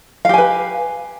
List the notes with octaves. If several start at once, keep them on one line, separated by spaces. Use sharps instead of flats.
G4 B4 F5 G#5